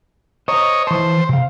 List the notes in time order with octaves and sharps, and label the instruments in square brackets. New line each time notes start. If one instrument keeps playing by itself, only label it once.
[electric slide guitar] C5 A#5 [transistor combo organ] C#5 D#5
[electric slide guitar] E3 A5 [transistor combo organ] C5
[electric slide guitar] C3 F5